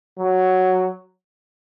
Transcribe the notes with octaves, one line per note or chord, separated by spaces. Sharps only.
F#3